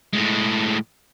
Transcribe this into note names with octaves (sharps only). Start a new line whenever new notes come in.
A2 G#3